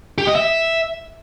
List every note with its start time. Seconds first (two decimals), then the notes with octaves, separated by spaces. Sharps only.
0.18 G4
0.27 D#5
0.36 E5